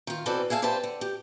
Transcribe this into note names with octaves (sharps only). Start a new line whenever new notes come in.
D#3 F4
B2 E3 C4 A4 B4 D5
G#4 E5 F5 G5 A5
G4 B4 C5 D5 G5 A5
D3
G4